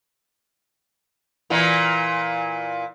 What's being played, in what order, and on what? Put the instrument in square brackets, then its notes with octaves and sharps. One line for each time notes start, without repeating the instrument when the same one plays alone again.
[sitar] A#2 E3